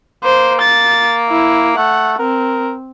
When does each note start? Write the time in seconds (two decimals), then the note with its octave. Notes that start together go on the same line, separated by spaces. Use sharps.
0.24 A#3 C5
0.62 A6
1.30 E4
1.77 A3 F#5
2.19 C4 A#4